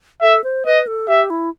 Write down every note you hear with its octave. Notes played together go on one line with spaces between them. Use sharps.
A4 E5
C5
B4 D#5
A4
G4 E5
E4